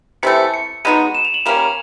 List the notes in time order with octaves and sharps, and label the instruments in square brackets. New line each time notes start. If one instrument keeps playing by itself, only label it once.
[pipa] C3 E3 A3 [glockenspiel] C#7
[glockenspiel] C#7
[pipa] G#3 B3 D#4 F#4 [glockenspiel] D#7
[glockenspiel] E7
F7
F#7
[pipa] G3 A#3 C#4 [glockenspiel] F7